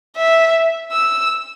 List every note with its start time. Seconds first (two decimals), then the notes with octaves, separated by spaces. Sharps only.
0.17 E5
0.92 E6